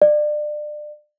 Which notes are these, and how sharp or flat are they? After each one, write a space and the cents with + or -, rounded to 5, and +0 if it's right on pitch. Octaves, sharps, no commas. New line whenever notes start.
D5 +30